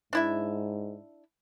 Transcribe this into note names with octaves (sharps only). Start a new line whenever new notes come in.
G#2 D4 E4 E5